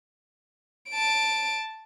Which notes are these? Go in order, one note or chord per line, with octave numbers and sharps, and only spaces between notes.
A5 D7